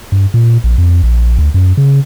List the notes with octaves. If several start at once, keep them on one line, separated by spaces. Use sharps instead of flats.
G2
A#2
A#1
F2
A#1
D2
F#2
C#3